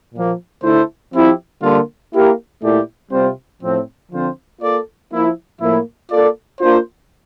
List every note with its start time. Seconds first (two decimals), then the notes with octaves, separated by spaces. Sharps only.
0.14 A#2 F3 A#3
0.63 D3 A3 E4 A4 C5
1.13 F3 C4 E4 G4
1.63 D3 G3 A#3 F4
2.13 A#3 E4 G4 A#4
2.62 A#2 A3 E4 G4 D5
3.12 C3 G3 C4 F4 C5
3.62 A2 F3 C4
4.12 D3 F3 C4 F4 C5
4.61 A#3 F4 A4 D5
5.11 F3 A#3 E4
5.60 A2 F3 A#3 E4
6.11 A#3 F4 A4 D5
6.61 A#3 D4 F4 C5